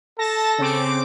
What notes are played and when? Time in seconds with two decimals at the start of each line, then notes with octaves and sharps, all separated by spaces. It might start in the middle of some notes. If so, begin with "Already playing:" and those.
0.19 A4 A5 A#6
0.58 C#3 C4 D6